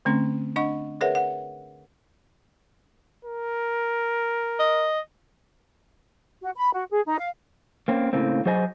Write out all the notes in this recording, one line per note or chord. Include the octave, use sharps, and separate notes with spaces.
D3 A3 C4 C#4
D4 D#5 F#5 C#6
G#4 A#4 B4 C#5 E5 F#5
F#5
A#4
D#5
F#4
B5
F#4
G#4
D#4
F5
A#3 C4 C#4
A2 C#3 A#3 C4
F#3 G#4 C5 D#5 G#5